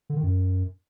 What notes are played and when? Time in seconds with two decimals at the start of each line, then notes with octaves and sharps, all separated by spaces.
0.10 D3
0.16 D#3
0.23 F#2